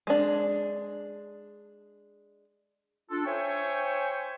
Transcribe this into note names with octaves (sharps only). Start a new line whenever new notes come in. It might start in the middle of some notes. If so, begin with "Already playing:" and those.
G#3 D4
D4 F4 A4
C5 C#5 E5 G5 G#5 C#6